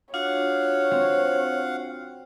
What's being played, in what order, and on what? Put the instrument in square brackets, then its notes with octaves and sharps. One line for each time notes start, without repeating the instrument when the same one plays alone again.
[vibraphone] D4 F4 F#4 [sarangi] C#5 [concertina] F5 F#5
[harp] C4